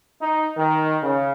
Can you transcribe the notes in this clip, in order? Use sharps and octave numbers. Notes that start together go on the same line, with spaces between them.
D#4
D#3
C#3